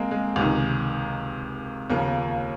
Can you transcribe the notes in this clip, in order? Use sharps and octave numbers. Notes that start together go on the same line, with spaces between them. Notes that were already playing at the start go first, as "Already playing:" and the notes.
Already playing: G#3 A#3 C4
G#3
C#2 C3 D#3
D#2 C#3 F3 A#3